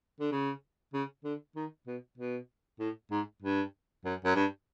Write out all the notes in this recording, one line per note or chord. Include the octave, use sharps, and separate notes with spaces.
D3
C#3
C#3
D3
D#3
B2
B2
A2
G#2
G2
F#2
F#2
G2